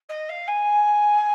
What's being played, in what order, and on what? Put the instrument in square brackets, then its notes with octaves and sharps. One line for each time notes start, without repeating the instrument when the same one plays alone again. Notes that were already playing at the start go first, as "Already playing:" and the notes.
[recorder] D#5
F5
G#5